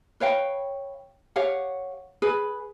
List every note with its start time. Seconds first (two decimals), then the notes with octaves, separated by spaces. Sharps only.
0.20 B4 C#5 F5 G5
1.36 G4 C#5 F5 F#5
2.22 G#4 B4